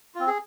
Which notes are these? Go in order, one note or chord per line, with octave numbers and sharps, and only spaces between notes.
C4 F4
G#4